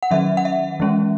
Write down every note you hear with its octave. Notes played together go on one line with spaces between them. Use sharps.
F#5
D#3 F#3 C#4 E5
F#5
E5
E3 G#3 C#4